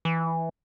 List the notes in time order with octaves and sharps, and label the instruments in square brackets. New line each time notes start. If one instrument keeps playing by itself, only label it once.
[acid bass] E3